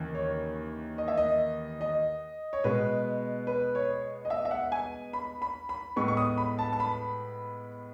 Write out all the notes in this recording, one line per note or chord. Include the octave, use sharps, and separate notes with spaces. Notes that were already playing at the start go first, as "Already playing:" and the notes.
Already playing: D#2 C#3 E3
C#5
D#5
E5
D#5
D#5
C#5
B2 G#3 B3 B4
B4
C#5
D#5
E5
E5
F#5
G#5
B5
B5
B5
A2 G#3 B3 C#6
C#6
D#6
B5
A5
A5
B5